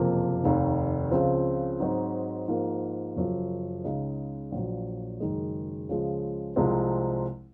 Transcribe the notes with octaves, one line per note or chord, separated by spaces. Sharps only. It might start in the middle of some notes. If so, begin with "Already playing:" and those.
Already playing: F#1 F2 C3 F3 A#3
F1 D#2 D#3
C#2 C#3 F3 C4
G#2 F#3 C4 D#4 F#4
G#2 F3 A#3
F#1 F#2 F3
C#2 C#3 G#3 D#4
A#1 A#2 F#3
F#1 F#2 D#3 G#3
C#2 C#3 F3 G#3
C2 C3 F3 G#3 C4